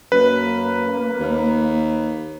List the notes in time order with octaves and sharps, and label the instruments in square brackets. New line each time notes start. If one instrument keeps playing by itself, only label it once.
[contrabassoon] F#2 [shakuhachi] A#3 [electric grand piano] B4
[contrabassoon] D#2